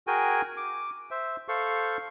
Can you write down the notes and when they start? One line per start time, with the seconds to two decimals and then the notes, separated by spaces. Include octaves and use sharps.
0.07 F#4 G#4 A#4 G5 G#5
0.57 D6
1.11 C5 E5
1.48 A4 C5 F5 C#6